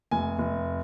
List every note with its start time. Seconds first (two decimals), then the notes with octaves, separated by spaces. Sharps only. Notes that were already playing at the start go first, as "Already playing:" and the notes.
0.11 F1 G#5
0.38 F1